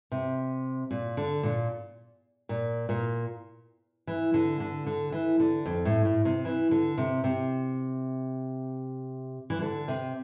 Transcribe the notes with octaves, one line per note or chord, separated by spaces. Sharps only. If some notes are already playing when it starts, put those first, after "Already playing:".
C3
A#2
D3
A#2
A#2
A#2
E3
D3
D3
D3
E3
D3
F2
A2
A2
C3
E3
D3
C3
C3
E3
D3
C3